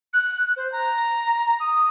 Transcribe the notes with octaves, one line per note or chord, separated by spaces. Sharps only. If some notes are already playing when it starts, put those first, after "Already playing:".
F#6
C5
A#5
D#6